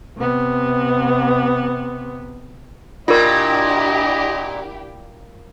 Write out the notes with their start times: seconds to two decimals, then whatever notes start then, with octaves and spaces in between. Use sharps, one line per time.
0.18 C3 B3
3.08 A#2 D4 E4 F4 G4 A#4 D#5